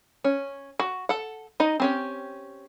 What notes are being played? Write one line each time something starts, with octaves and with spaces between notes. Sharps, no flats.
C#4
F#4
A4 F#5
D#4 D#5
C4 C#4 G4